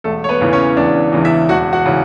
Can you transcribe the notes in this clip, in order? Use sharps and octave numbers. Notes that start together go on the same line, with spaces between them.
E1 A3 A4
C#5
B3 B4
E2 C#3 E3
C#4 C#5
E1 D4 D5
E2 C#3 E3
E4 E5
E1 F#4 F#5
F#4 F#5
C#3 E3